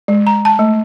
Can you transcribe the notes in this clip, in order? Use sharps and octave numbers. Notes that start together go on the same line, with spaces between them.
G#3
A#5
A5
A3